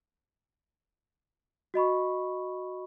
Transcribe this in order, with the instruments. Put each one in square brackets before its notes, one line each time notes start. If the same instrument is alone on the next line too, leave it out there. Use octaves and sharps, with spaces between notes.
[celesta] F#4 D#5 B5 C#6